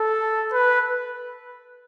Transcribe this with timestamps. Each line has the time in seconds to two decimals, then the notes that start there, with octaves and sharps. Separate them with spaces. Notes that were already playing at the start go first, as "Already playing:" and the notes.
Already playing: A4
0.52 B4